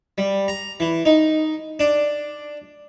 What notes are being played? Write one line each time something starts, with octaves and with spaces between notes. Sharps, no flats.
G3
A#5
E3
D#4
D4